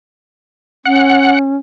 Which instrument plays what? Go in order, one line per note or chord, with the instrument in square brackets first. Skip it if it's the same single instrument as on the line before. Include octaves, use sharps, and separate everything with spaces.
[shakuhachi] C#4 [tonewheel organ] F#5